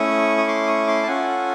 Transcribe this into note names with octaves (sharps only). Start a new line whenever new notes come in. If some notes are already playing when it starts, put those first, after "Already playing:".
Already playing: A3 C#4 E4 C#6 D#6
D#6
C6 D6
C#6 D#6
C6 D6
A5
C#4 F4 A4 F#5 G#5